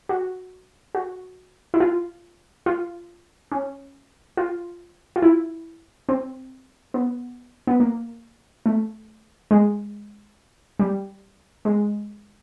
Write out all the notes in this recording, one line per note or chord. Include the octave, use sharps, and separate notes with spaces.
F#4
F#4
E4
F4
F4
C#4
F4
F4
E4
C4
B3
B3
A#3
A3
G#3
G3
G#3